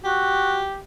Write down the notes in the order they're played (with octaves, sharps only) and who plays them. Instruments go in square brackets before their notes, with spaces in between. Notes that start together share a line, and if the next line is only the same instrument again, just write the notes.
[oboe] F#4 [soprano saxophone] G4